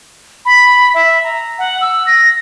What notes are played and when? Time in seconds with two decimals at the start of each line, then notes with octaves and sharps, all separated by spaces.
0.45 B5
0.94 E5
1.24 A#5
1.59 F#5
1.81 E6
2.07 A#6